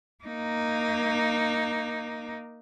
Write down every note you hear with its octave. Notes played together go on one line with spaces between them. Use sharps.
A#3 D#4